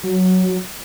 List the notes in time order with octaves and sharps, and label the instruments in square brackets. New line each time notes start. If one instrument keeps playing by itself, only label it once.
[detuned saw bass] F#3